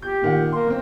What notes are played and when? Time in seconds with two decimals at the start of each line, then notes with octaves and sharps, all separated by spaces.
0.02 G4 G6
0.22 A#2 D#3 F#5
0.52 A#3 C6
0.67 G1 C4